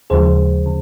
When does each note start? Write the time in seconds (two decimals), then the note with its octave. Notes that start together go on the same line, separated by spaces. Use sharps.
0.10 D#2 C#3 F3 G#3 G#4 C5
0.66 C#3